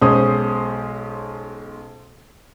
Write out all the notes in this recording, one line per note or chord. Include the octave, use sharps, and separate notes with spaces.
B1 G#3 C#4 C5 D#6